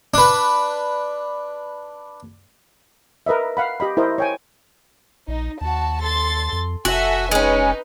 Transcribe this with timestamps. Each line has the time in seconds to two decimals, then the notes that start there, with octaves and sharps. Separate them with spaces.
0.14 D4 B4
3.26 A#4 B4 D#5 E5
3.57 F5 F#5 B5
3.80 G4 D#5 B5
3.97 E4 A#4 C5 D#5
4.18 C#5 G5 G#5
5.28 A#1 D#4
5.61 D#2 F#4 A5
6.03 A4 C6 A6
6.52 F2
6.85 F1 F#4 A4 E5 G#5
7.31 G#3 C#4 D#4 B4